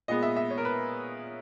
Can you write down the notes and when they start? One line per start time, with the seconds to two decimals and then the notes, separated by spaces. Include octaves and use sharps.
0.08 A#2 G#3 B3 D#5
0.23 E5
0.36 E5
0.51 C#5
0.58 A#4
0.65 B4